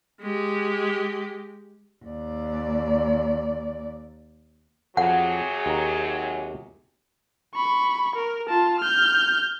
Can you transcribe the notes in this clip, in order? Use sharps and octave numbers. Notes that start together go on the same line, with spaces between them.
G#3 G4
D#2 D5
F2 C3 F#3 G#4 F#5
D#2 A#5
B5 C#6
A#4
F4 A5
F6 G6